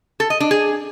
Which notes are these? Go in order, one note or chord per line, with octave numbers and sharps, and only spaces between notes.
A4
D#5
D4
G#4